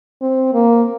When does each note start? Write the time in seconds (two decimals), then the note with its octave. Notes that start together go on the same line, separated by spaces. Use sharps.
0.22 C4
0.54 A#3